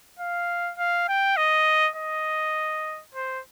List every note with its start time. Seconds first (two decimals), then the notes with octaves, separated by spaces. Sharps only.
0.19 F5
0.78 F5
1.08 G5
1.37 D#5
1.96 D#5
3.14 C5